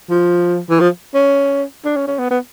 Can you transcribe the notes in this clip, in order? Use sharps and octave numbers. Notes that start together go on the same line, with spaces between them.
F3
E3
F3
C#4
D4
C#4
C#4
B3
B3